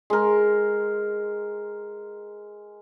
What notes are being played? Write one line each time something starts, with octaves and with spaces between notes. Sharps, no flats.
G#3 A#4